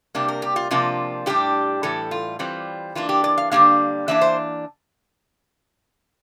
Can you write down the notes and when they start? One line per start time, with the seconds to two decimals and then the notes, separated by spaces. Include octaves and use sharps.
0.15 C3 G3 A#3 D4
0.28 A#4
0.42 G4
0.56 F4
0.71 C3 F3 A#3 D4 F4
1.26 A2 G3 D4 G4
1.83 A2 E3 G3 A4
2.11 F4
2.39 E3 G3 C4 F4
2.95 E3 A#3 D4 F4
3.09 G4
3.24 D5
3.38 F5
3.51 D3 G3 A#3 D4 F5
4.08 E3 A#3 D4 E5
4.21 C5